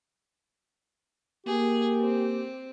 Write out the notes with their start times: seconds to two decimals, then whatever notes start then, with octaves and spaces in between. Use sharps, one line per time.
1.47 A#3 G4 G#4
2.01 C4